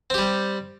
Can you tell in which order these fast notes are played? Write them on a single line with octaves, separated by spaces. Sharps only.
C4 G4 G3